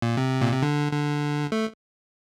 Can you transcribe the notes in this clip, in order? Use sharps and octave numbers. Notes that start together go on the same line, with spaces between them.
A#2
C3
A#2
C3
D3
D3
A3